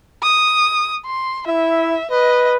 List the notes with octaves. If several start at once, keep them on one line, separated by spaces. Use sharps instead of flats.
D#6
C6
E4 E5
B4 D#5